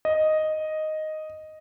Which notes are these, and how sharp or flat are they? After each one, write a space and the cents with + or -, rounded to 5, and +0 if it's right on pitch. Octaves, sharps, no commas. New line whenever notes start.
D#5 +0